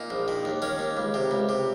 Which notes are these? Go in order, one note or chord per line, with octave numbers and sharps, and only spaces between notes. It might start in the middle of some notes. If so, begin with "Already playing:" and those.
Already playing: A#2 D#4
A#1
D#3
D#2
D#3 C#4
D#2
C#2
C3
C#2
C3